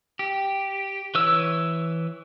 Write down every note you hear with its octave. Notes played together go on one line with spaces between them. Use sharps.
G4
E3 B4 C#5 E6